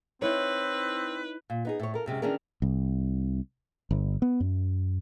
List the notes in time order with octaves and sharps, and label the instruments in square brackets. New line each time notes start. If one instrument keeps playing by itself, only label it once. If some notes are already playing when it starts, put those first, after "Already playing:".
[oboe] C4 [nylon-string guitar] D#4 E4 C#5 [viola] B4
[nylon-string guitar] A#2
B3 D#4 G#4
A2 C#5
A4 A#4
F#2 C3 G#3 C#4
D#3 E3 C#4 D4 G#4 A#4
[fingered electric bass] C2
G1
B3
F#2